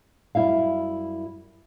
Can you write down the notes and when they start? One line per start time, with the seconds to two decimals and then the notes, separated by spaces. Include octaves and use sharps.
0.35 F#2 G3 E4 E5 F5